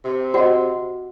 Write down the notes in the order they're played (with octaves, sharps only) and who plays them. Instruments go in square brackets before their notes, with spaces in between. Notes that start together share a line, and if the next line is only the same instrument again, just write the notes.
[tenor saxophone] C3
[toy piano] F#4 F#5 [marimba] C5 D#5